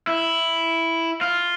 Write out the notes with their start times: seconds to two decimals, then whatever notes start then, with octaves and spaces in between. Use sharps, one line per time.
0.07 E4
1.21 F4